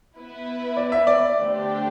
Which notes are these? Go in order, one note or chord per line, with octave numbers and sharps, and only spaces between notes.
B3 E4 B4
D5
E5
D5
D3 A3 D4 G4 C5